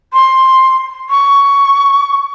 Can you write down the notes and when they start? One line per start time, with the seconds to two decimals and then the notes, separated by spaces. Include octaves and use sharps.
0.13 C6
1.10 C#6